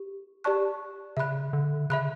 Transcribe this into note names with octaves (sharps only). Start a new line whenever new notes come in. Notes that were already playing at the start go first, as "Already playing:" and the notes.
Already playing: G4
G4 D5 A5 C#6 F#6
C#3 E5 B5 F#6
D3
C#3 E5 B5 F#6